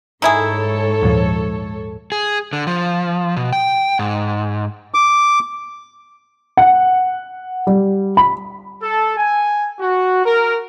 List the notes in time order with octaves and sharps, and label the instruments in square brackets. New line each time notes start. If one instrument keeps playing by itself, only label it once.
[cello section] G#2 A4 C#5 [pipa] D#3 E4 G#4
[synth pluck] D#2 A#2 F3
[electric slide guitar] G#4
D3
F3
B2
G5
G#2
[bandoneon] D6
[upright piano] F#5
G3
B5
[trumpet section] A4
G#5
F#4
A#4